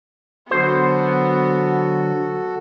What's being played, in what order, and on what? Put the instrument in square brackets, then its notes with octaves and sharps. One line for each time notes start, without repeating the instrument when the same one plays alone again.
[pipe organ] D3 F#3 [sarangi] B3 [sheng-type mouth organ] F#4 A4 [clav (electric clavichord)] C5